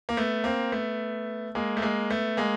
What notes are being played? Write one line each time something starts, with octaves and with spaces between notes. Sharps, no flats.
A#3
A3 B3
A#3 C4
A3 B3
G#3 A#3
A3
G#3 A#3
A3 B3
G#3 A#3